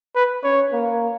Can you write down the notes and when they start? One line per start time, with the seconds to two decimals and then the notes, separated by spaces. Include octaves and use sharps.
0.15 B4
0.44 C#4 C#5
0.72 A#3